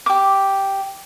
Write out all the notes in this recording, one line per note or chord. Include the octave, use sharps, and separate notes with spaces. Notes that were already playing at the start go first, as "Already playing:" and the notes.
G4 D6